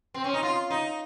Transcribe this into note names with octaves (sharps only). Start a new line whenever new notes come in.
C4
C#4
D#4
F4
D#4